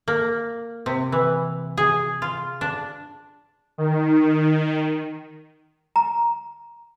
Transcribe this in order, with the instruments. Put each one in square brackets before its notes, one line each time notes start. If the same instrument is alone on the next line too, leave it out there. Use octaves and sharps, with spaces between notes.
[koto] A#3
C3
E3
G#4
F4
D4
[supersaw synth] D#3
[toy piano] A#5